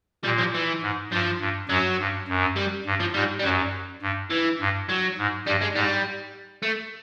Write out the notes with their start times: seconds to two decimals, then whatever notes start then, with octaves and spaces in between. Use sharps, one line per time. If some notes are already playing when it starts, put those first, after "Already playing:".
0.24 A#2 G3
0.39 F3
0.54 E3
0.82 G#2
1.12 G2 F3
1.40 G2
1.69 F#2 F#3
1.99 G2
2.28 F#2
2.57 G3
2.86 G2
3.00 F3
3.14 G#2 G3
3.39 G3
3.44 F#2 F#3
4.02 G2
4.31 E3
4.60 G2
4.89 F#3
5.18 G#2
5.47 G2 G3
5.61 G#3
5.75 G#2 G3
6.63 A3